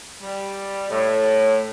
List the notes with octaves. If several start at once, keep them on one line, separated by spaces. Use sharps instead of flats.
G3
A2